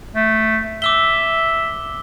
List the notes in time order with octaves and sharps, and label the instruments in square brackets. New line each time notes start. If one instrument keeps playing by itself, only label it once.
[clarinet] A3
[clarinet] E5 [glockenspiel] D6 E6 G7